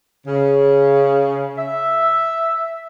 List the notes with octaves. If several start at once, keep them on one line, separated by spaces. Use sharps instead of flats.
C#3
E5